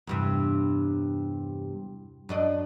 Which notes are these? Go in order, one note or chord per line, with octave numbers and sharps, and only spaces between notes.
E2 G2 C3
F#2 D4 D#5